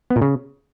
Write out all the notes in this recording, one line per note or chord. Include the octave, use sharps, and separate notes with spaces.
B3
A#2
C#3